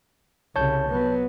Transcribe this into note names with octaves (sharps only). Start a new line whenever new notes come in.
C2 C#3 C#5 A5 G6
F#3 B3